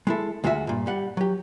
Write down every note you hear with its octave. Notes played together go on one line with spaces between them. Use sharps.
G#3 E4 A4
D2 G#3 F4 F#4 E5
G2 A#2
G3 F#5
F#3 G4